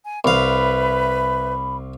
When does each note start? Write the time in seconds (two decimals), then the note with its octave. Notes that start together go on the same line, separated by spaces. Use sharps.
0.03 G#5
0.25 C2 B4 E5 F5 B5